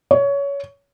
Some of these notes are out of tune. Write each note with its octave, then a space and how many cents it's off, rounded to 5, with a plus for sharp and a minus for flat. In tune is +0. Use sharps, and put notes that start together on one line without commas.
C#5 +20